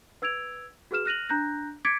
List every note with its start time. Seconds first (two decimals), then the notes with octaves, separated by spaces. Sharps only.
0.22 B4 E6 G#6 D7 F7
0.91 F#4 G#4 B4 F6 E7
1.05 F6 F#6 A#6 D#7 F7 F#7
1.29 D4 A#5 F#6 G6 A#6
1.85 D6 G#6 A6 B6 C#7 D7